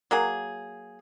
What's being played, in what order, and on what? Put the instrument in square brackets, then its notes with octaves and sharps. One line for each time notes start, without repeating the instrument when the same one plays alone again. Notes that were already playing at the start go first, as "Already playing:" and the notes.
[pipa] F#3 A#3 G#4